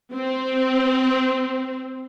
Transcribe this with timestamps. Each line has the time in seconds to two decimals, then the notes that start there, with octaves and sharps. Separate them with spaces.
0.14 C4